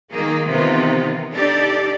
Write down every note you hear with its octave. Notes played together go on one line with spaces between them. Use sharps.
D#3 A#3 G#4 A#4
C3 D#3 E3 B3 D#4 F4
D4 D#4 G4 A4 D5